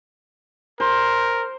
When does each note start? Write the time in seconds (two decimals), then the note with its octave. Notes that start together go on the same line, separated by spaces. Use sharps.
0.80 A#4 C5